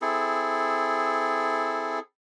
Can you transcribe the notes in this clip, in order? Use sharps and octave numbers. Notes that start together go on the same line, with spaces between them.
C4 E4 G#4 A4